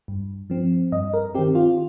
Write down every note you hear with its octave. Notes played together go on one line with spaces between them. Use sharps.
G2
F3 C4
G2 D#5
A#4
D#3 C4 G4
F4